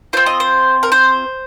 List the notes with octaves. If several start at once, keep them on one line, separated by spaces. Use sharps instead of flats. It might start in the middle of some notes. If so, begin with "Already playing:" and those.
C4 F4 C5
D#5
C5
A#4
C5